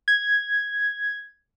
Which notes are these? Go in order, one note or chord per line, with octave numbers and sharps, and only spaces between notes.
G#6